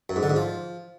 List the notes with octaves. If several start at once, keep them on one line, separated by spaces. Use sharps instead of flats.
F#2
G#2
D3
G#2
F3